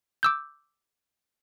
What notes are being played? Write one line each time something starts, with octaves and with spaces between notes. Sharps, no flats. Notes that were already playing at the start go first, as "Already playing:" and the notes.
D6 E6 G6